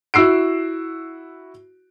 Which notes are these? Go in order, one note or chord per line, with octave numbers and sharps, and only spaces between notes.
E4 F#4 E6 C7 D7